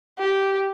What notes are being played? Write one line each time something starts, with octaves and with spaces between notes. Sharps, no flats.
G4